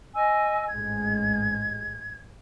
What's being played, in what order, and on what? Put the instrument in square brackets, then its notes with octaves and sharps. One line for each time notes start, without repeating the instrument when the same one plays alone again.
[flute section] D#5 G#5 E6
[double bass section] A1 G#2 G#3 [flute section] G#6